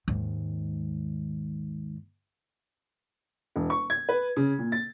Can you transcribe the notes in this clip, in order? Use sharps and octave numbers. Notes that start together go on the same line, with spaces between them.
D#2 G#2
E1
C#6
G#6
B4
C#3
A#2
A6